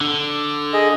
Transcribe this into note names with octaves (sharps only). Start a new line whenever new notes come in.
D3
G#4 D#5